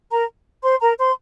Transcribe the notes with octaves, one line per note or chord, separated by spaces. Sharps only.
A#4 A#5
C5 C6
A#4 A#5
C5 C6